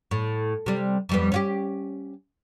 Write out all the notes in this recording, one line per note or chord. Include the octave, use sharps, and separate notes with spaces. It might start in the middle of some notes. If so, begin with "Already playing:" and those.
A2
C3 G3
F2 G3 B3
C#4 F4 G4